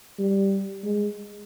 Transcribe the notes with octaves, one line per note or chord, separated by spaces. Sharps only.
G3
G#3